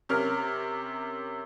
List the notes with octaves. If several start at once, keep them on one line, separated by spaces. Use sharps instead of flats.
C3 C#4 A#4 F6